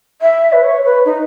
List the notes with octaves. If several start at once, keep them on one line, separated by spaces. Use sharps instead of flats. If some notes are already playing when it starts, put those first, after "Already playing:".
E5
B4
C#5
B4
D#4